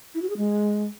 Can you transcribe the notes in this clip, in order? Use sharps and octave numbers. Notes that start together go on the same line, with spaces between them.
E4
F#4
G#4
G#3